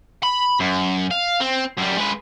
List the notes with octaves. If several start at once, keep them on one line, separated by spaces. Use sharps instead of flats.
B5
F#2
F5
C4
F#2 G3
G#3 B4